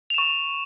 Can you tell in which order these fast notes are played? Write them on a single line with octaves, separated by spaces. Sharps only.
F7 E7 C#6